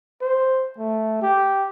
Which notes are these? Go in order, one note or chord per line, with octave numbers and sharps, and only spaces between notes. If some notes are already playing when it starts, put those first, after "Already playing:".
C5
A3
G4